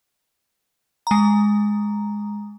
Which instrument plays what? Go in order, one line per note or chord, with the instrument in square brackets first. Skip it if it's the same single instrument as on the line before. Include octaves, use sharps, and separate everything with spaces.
[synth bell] G#3 A#5